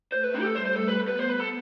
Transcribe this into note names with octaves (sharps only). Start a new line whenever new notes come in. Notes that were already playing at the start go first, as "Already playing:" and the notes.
A3 C5
B4
C4
G4
A4
G3 C5
C5
A4
B4
B3
B4
C5
B4
A4